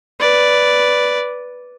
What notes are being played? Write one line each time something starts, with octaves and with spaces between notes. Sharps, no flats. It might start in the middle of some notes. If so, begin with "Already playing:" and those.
B4 D5